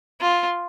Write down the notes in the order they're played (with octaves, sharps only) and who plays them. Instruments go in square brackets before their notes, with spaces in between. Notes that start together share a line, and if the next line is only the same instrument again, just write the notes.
[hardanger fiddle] F4